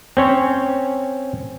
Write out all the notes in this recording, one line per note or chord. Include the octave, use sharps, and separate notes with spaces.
C4 C#4 C#5